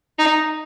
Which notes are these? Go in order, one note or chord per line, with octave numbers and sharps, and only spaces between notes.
D#4